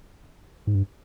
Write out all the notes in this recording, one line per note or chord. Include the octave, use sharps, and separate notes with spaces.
G#2
G2